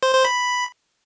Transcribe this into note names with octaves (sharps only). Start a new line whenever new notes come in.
C5
C5
B5